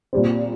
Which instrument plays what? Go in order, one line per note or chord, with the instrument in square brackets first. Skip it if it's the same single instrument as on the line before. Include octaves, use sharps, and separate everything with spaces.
[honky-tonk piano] A#2 G3 C4